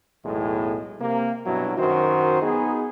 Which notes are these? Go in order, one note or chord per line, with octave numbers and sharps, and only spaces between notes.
B1 E2 A2 G#3
C3 A#3
G2 B2 F#3 E4
F#2 D#3 F#4 C5
B3 D#4 G#4